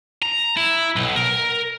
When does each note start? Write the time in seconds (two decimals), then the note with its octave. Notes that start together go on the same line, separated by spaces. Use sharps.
0.23 A#5
0.57 E4
0.96 B1
1.16 A#4